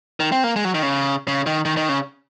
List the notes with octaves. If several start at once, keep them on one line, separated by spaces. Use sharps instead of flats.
D#3
C4
A#3
G#3
F#3
D#3
C#3
C#3
D#3
D#3
D#3
C#3